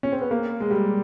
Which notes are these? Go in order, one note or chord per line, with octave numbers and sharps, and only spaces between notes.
C#4
C4
B3
A#3
G#3
G3